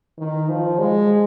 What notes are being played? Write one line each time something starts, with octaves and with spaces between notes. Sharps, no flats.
D#3
F3
G#3